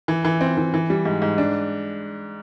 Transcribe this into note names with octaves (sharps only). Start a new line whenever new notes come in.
E3
E3
C4
E3
E3
G3
G#2
G#2
D4